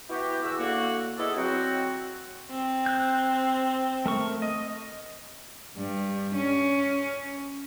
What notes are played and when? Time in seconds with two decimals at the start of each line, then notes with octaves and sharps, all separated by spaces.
0.10 B3 E4 F#4 G4
0.43 E2 F#4 E6
0.59 A2 D3 A#3 F#4
1.18 B3 E4 G#4 A4 D5 D#5
1.36 F#3 C4 F#4
2.51 C4
2.86 F#6 G6
4.06 A3 A#4 C#6
4.42 D#5
5.77 G2
6.36 C#4